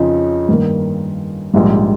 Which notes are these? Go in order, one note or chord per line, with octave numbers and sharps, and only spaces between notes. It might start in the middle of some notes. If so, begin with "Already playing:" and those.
Already playing: F2 C#3 F3 D#4
G2 D#3 A#3
A#1 G#2 G3